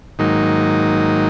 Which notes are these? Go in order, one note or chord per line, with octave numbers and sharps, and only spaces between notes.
G#2 D#3 F#3 A#3 D#4